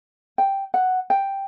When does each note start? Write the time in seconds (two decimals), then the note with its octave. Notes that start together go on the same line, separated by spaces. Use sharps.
0.38 G5
0.74 F#5
1.10 G5